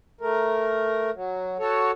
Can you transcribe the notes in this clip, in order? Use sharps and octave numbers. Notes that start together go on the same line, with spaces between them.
A3 A#4
F#3
F#4 A4 C#5